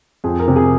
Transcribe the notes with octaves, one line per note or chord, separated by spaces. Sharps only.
F2 G#4
A#4
C3
G#4